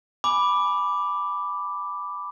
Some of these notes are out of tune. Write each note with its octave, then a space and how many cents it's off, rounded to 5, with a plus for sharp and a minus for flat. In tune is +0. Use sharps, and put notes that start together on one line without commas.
G#5 +0 B5 +0 D6 +0